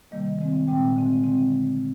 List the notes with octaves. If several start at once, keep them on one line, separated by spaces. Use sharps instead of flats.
C3 D#3 G3 A#3 D#5
D#3 G#3 C4
A#2 G#3 C4 G5
D3 G#3 C4
D3 G#3 C4